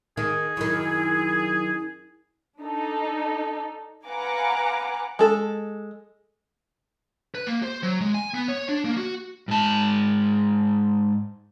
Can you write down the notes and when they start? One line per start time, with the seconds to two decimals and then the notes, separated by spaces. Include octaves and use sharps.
0.17 D#3 G#4
0.57 F#2 D#3 E4
2.59 D4 D#4 A4
4.07 B4 F5 F#5 G#5 A#5 D6
5.19 G#3 A4
7.35 B4
7.47 A#3
7.63 C5
7.83 F#3
8.01 G#3
8.14 G#5
8.34 B3
8.48 C#5
8.69 D4
8.85 A#3
8.97 F#4
9.48 G#2 A5